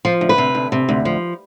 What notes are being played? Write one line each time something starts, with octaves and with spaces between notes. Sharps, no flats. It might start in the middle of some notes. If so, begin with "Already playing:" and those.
F3 F4
D2
B4
C3
D2
C3
D2
F3